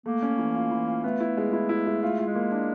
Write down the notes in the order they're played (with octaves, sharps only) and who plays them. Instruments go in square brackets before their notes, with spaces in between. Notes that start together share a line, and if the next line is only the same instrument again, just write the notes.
[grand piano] A3 [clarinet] A#3
[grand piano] C#4
E3
F4
E3
F4
[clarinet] A3 [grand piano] B3
[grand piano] E4
G#3
E4
E4
G#3
[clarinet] A3 [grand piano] F4
[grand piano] F4
[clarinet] G#3
[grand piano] A#3
D4